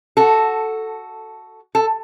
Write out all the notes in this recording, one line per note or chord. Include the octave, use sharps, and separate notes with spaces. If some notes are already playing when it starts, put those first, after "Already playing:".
F#4 A4
A4